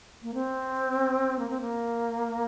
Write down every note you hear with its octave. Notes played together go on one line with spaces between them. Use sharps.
A#3
C4
A#3
C4
A#3